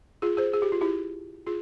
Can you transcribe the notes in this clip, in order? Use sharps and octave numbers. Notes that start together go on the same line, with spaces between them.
F4 G#4
G#4 C5
G#4
G4
F4
E4 G4
F4 G#4